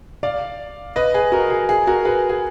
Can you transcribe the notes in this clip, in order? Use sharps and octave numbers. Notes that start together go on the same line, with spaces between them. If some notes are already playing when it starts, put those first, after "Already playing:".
D5 F5
B4 D#5
G#4 B4
F#4 A#4
G#4
G#4
F#4 A#4
G#4 B4
G#4